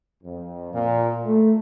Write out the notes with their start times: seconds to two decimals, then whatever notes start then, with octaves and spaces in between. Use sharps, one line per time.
0.23 F2
0.74 A#2
1.25 A3